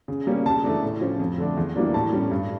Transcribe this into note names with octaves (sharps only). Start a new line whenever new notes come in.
C#3
G3 A#3 C#4
C#3 A5
E3 A3 D4
A2
F3 C#4
F2
D3 A3 D4
E2
E3 G3 A#3 D4
A2 A5
G3 C#4
G2